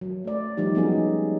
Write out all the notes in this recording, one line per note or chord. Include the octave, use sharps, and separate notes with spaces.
F#3
A3 D5
F3 G3 D#4 G4
F#3 G#3 B3 C#4 D#4 G#4